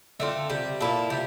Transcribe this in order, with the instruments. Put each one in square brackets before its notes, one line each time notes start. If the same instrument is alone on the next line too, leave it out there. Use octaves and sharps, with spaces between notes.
[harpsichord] D3 [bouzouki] A3 C4 F4
[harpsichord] C3 [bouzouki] G3
[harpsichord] A#2 [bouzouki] A#3 E4 A4
[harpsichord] C3 [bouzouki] G3